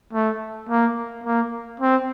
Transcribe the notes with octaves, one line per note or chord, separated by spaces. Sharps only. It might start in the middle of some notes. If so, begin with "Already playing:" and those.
A3
A#3
A#3
C4